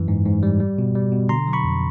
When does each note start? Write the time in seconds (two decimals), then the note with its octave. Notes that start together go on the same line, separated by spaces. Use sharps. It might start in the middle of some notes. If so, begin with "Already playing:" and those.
Already playing: F#2 E3
0.08 G#2
0.25 G#2
0.43 G3
0.60 G3
0.79 B2
0.95 G3
1.12 B2
1.29 D3 A#5 C6
1.48 F#3
1.53 B5 C#6
1.64 F2